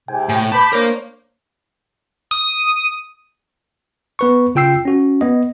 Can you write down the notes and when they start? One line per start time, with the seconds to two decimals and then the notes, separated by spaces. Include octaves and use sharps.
0.08 G#2 C3 G5 G#5
0.29 A2
0.52 A5 B5 D6 G6
0.73 A#3 D4 A#4 C5 C#5
2.31 D#6
4.19 B3 B4 C#6
4.55 C#3 F4 G5 E6 C7
4.85 C#4 F#4
5.21 B3 D#5